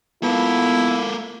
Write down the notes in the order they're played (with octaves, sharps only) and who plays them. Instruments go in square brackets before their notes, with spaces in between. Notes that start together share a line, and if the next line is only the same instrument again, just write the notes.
[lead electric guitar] A#3 A4 [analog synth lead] B3 [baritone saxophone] E4 [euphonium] F4